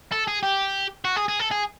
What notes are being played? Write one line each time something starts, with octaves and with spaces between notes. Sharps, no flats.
A4
G#4
G4
F#4
G#4
G#4
A4
G#4